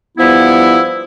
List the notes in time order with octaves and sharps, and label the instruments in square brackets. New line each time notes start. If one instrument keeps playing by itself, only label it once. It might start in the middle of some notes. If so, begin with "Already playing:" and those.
[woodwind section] G2 F3 B3 E4